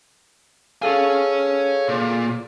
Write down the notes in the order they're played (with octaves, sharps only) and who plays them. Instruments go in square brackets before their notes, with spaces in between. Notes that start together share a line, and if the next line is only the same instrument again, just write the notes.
[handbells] G#4 A4 F5 [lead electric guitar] C#5 G#5
[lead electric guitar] A#2